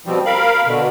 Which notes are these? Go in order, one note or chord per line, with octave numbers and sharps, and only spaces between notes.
B2 F3 G3 C4
A#4 F5 B5
B2 D3